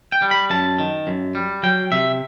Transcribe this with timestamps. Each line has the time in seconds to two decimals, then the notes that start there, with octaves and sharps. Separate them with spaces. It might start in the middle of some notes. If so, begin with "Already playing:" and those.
0.12 G5
0.22 G3
0.31 B5
0.50 F#2 A5
0.79 D#3
1.07 F#2
1.35 G3
1.63 F#3 G5
1.92 C3 E5